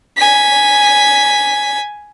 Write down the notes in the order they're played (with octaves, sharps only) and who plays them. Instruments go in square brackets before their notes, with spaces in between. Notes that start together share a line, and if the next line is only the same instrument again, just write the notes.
[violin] G#5 B6